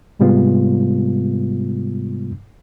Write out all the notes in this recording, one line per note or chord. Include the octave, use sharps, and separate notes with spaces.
G#2 C3 G3 G#3 B3 F4